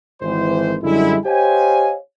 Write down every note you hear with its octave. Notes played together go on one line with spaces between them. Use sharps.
G#1 E3 C5
F#2 D3 G3 G#3 E4
G4 C5 C#5 D#5 F5 G#5